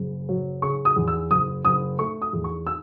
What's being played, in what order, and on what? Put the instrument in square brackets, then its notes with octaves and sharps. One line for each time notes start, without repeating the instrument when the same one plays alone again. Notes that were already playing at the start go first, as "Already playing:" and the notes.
Already playing: [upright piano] F#1 C#3
F#3
C#3 C#6
D#6
E2
E6
F#1 D#6
F#1 D#6
A3 C#6
D#6
E2
C#6
E6